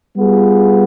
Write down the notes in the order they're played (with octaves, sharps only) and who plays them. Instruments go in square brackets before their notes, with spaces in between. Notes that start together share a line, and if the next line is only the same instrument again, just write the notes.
[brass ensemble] G3 B3 F4 G#4